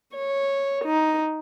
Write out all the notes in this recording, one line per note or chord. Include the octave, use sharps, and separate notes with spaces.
C#5
D#4